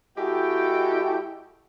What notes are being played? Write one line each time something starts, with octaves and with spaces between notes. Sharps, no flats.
G#3 E4 F#4 G4 A4 G5